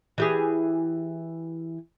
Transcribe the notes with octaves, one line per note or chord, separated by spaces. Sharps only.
E3 G4 G#4